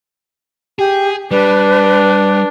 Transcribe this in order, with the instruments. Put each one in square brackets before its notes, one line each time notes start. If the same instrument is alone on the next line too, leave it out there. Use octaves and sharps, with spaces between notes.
[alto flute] G4 [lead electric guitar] G#4
[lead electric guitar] G3 [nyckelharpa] D4 [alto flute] B4